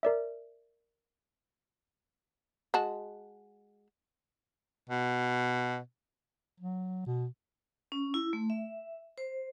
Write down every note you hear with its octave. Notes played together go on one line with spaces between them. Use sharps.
A#4 D5 E5
G#3 F#4 A5
B2
F#3
B2
C#4
E4
A3
E5
C5